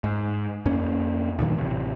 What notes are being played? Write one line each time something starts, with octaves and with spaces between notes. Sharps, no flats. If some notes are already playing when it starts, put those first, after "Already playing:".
G#2
F2 A#3 C#4
D2 A#2 D#3 F#3
A1 C3